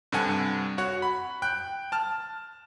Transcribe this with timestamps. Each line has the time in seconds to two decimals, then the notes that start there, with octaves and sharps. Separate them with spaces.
0.12 G2 C3 G3 A4 F#5 G#5
0.78 F#4 C#5 F#5
1.02 B5
1.42 G5 F#6
1.92 A5 F6